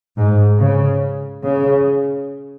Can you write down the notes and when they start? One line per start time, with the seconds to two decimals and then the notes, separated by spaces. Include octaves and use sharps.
0.17 G#2
0.60 C#3
1.44 C#3